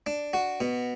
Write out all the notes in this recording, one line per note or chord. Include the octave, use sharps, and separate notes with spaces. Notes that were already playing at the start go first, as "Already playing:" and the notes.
D4
F#4
B2